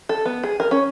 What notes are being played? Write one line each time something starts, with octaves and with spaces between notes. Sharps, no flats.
A4
B3
G#4
A#4
C#4